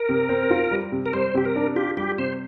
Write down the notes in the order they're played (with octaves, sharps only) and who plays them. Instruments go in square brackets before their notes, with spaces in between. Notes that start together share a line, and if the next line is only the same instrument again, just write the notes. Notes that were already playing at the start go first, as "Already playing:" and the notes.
Already playing: [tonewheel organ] A#4
[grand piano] C3
C4
F4
G3
C3
[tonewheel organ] A#4
[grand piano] G3 [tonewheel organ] C5
[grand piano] C3 [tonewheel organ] G4
[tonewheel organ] A#4
[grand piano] D4
[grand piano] F4 [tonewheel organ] G4
[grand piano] G3 [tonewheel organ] G4
[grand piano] C3 [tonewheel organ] C5